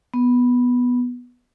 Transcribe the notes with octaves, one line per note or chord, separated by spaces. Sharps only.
B3